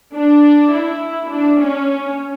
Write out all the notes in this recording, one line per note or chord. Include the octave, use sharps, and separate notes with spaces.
D4
E4
D4
C#4